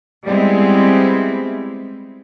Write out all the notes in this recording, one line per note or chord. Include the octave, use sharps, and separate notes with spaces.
G3 G#3 B3 C4 E4